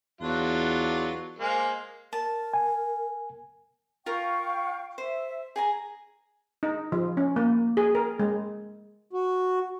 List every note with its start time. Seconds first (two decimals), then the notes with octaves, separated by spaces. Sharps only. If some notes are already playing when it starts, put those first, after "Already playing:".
0.21 E2 F#3 D4 F4
1.39 G#3 A#3 C5
2.13 A#4 A5
2.54 G#5
4.06 F4 A#4 F5 G5 C#6
4.98 C5 E5
5.56 G#4 G#5 A#5
6.63 D#4
6.92 F3
7.17 C#4
7.36 A#3
7.77 G#4
7.95 A#4
8.19 G#3
9.13 F#4